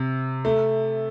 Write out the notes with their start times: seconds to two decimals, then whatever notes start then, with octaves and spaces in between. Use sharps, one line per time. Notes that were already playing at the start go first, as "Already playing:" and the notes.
Already playing: C3
0.45 A3